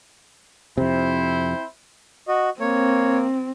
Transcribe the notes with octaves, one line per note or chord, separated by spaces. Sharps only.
F2 C3 C4 E4 C5
F#4 D#5
A#3 C4 C#5